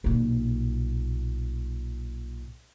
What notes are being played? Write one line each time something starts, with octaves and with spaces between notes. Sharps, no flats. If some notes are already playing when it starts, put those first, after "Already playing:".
B1 A#2